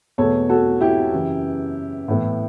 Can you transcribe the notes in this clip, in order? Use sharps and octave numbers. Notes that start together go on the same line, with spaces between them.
E2 B2 A3 A4 C#5
F#4 A4
E4 G4
F#2 C#3 E3
A2 E3 B3